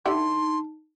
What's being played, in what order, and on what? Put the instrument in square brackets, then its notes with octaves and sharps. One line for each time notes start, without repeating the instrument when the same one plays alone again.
[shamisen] D3 E4 G4 [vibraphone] D#4 A5 [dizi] C6